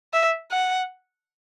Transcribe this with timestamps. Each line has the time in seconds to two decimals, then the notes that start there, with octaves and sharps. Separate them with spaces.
0.14 E5
0.52 F#5